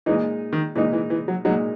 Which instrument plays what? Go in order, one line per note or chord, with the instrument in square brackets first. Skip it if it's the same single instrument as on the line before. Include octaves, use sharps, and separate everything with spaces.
[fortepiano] A#2 G#3 D#4 [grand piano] E3
[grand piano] D#3
[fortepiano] A#2 G#3 D#4 [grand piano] E3
[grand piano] E3
E3
F#3
[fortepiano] A#2 G#3 D#4 [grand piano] F#3